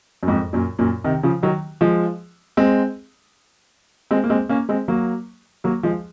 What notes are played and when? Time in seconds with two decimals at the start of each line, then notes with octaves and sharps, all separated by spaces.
0.23 F#2
0.28 F2 G#2
0.53 F#2 A#2
0.79 F#2 A#2
1.04 C3 D#3
1.23 C#3 F3
1.43 D#3 F#3
1.81 F3 G#3
2.57 G#3 C4
4.11 G#3 C4
4.24 A#3
4.30 G#3 C4
4.49 A#3 C#4
4.69 G#3 C4
4.88 F#3 A#3
5.64 F#3 A#3
5.83 F3 G#3